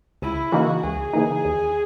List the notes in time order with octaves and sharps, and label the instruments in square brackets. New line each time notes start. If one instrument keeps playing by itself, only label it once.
[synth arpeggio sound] C#2 [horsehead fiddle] E4
[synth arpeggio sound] C#3 E3 A#3 D#4 [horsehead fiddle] F#4
[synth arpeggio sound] C#2 [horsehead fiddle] G#4
[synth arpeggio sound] C#3 E3 A#3 D#4
D#2